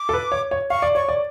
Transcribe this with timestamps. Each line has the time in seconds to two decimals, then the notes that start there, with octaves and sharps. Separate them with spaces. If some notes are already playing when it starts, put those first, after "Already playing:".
Already playing: D6
0.09 A4
0.13 B4
0.32 C#5
0.51 C#5
0.70 F5 C#6
0.82 D5
0.95 C#5 C#6
1.08 D5